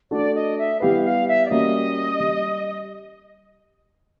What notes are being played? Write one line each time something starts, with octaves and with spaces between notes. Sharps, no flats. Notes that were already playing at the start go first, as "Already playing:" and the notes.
A3 D4 F#4 A4 D5
D#5
E5
G3 B3 E4 G4 B4 F5
F5
E5
D5
G3 A#3 C#4 F#4 D#5
G3